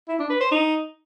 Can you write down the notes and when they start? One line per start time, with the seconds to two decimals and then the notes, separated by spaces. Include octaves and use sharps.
0.08 E4
0.19 D4
0.30 B4
0.40 C5
0.51 D#4